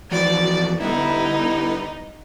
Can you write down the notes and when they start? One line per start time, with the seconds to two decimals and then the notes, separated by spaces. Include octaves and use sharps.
0.11 F2 E3 F3 F#4 D5
0.80 D3 G3 B3 D#4 E4